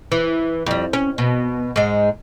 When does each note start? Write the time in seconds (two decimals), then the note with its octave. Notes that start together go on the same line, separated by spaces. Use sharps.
0.12 E3
0.66 F2 G3
0.93 C#4
1.18 B2
1.76 G#2 G#3